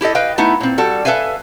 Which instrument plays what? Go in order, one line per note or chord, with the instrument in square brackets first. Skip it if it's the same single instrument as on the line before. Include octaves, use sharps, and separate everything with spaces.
[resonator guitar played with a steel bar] E4 G4 A4 D#5
B4 D#5 F5 G5
A3 B3 D#4 E4
A#2 C4
G3 F#4 A4
A4 B4 E5 F5 G#5